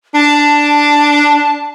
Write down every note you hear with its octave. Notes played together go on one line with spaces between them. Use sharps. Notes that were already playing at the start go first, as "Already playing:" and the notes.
D4 A5